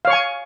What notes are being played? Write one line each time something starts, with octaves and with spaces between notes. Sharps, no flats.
C#5 F5 G#5 C#6